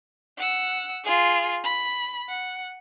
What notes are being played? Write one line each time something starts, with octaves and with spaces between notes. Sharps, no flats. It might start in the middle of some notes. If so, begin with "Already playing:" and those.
F#5 E6
F4 G#4
B5
F#5